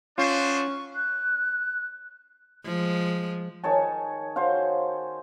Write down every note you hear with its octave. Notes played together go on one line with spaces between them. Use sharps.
B3 C#4 D4 F4 C5 C#6
F#6
F3 G#3
D#3 G#4 C#5 A5
F#4 C5 C#5 F5